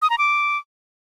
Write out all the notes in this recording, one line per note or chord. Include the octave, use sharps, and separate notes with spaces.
D#6
A#5
D6